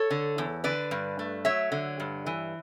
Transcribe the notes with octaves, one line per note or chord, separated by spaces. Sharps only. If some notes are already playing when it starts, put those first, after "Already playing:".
Already playing: A4 C#5
D3
E2
D3 B4 D5
G2
A3
F#3 C#5 E5
D3
G2
E3